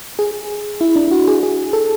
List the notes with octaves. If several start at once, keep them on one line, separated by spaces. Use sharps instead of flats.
G#4
E4
D4
E4
F#4
G#4
G#4
A4